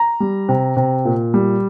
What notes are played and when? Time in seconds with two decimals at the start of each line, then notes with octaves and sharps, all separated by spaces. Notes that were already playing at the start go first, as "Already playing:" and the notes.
Already playing: A#5
0.20 G3
0.49 C3
0.77 C3
1.05 A#2
1.34 G3